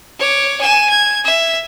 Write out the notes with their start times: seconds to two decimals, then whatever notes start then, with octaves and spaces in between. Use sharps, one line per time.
0.19 C#5 D6
0.61 G#5 E7
0.89 G#6
1.25 E5